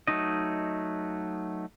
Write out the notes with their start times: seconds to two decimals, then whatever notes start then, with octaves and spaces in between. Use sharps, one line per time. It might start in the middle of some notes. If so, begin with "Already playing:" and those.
0.07 F#3 A3 D#4 D#5